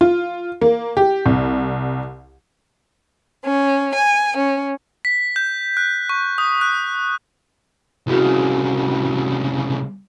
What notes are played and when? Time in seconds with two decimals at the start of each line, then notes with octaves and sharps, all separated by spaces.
0.01 F4
0.61 A#3
0.97 G4
1.26 C2
3.44 C#4
3.93 G#5
4.37 C#4
5.05 B6
5.36 G6
5.77 F#6
6.09 C#6
6.38 D#6
6.61 F#6
8.07 C2 C#3 E4 F#4